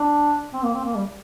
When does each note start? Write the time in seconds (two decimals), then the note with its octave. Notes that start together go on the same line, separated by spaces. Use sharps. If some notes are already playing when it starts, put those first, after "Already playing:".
Already playing: D4
0.53 C4
0.64 A#3
0.74 C4
0.85 A#3
0.95 G3